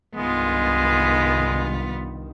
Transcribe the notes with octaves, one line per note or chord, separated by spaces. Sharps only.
C2 G2 D#3 G#3 B3 F4